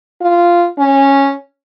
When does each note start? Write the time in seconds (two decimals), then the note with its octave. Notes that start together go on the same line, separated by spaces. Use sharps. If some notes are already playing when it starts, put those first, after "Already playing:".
0.22 F4
0.79 C#4